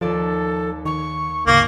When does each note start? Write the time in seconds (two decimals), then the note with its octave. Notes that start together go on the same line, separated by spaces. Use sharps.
0.01 D#2 F3 A4 D5 A5
0.85 D#3 C#6
1.47 G#1 D2 C#3 A#3 D5 C#6